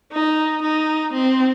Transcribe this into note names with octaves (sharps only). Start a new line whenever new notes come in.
D#4
D#4
C4